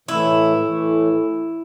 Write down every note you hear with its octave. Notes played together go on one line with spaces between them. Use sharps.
A2 E3 A3 E4
A2 E3 A3